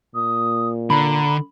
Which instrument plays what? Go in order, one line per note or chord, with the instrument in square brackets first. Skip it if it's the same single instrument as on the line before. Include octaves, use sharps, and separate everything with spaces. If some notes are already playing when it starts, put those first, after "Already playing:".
[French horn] A#2 [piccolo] D#6
[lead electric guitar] D3 [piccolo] A#5 [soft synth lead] B5